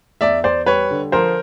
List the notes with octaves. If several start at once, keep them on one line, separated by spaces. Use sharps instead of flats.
E2 D5 E5
E2 C5 D5
G3 B4 C#5
D3
F3 A#4 C5